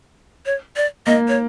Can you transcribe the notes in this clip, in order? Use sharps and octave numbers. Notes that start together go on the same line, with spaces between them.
C#5
D5
A#3 D#5
C#5